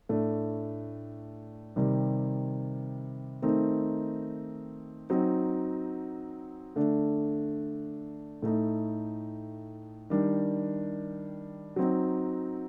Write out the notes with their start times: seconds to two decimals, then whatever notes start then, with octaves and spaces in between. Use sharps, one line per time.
0.09 A2 A3 D4
1.76 C3 D#3 G3
3.42 D#3 A3 C4 D#4
5.10 F#3 C4 D#4
6.76 D3 A3 D4
8.42 A2 A3 D#4
10.10 D#3 G3 D4
11.76 F#3 C4 D#4